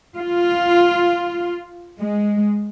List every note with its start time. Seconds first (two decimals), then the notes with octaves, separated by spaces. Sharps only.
0.17 F4
1.99 G#3